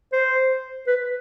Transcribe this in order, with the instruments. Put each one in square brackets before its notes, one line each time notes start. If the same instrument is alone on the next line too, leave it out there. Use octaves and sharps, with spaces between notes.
[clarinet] C5
B4